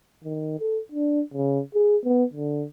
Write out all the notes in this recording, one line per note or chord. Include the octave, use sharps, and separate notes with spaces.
D#3
A4
D4
C#3
G#4
B3
D3